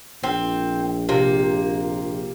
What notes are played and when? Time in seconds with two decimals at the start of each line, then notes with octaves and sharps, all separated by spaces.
0.23 A#1 C4
1.09 C3 A#3